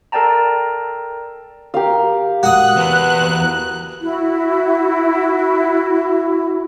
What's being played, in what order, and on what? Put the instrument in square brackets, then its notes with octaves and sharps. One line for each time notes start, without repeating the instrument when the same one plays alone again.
[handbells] A4 A#4 D5 G5 A5 A#5
[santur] G4 A#4 F5
[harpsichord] F#4 D#6 [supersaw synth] F#6
[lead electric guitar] E2 B3
[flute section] E4 F#4